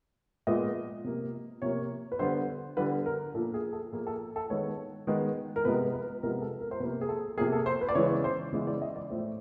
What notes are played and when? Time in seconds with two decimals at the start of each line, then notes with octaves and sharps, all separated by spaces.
0.47 A#2 F3 G#3 B3 D#5
1.04 C3 F3 A#3
1.62 C3 F3 A#3 C#5
2.12 B4
2.19 D3 G3 B3 C5
2.77 D3 G3 B3 B4
3.06 A#4
3.34 A#2 F3 A#3 A4
3.54 G#4
3.73 A4
3.92 A#2 F3 A#3 G#4
4.07 A4
4.36 A4
4.50 D#3 G#3 B3 C#5
5.07 D#3 G#3 B3
5.56 A#4
5.65 C3 F3 G#3 B3 B4
5.93 B4
6.23 C3 F3 G#3 B3 A#4
6.42 A4
6.61 A#4
6.71 C5
6.80 C3 F3 A#3 B4
7.01 G#4
7.09 A4
7.37 C3 F3 A#3 G#4
7.52 A4
7.66 C5
7.81 B4
7.89 D5
7.95 C#3 E3 G#3 B3 C#5
8.24 C5
8.53 C#3 E3 G#3 B3
8.67 D5
8.82 D#5
8.96 D5
9.10 A2 F3 A3 C5